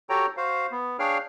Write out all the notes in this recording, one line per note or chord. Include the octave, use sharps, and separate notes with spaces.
F#4 G4 A4 C#5 G5 A#5
F#4 C5 F5
B3
D4 G#4 C#5 F5 G5 F6